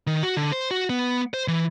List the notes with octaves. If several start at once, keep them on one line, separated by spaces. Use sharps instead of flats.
D#3
F#4
D3
C5
F#4
B3
C5
E3